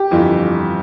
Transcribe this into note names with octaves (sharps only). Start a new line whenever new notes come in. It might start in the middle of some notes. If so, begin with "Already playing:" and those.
Already playing: G4
G1 F2 E3